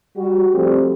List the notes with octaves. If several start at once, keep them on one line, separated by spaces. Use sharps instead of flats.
G3 F#4
F3 G3 A3 C4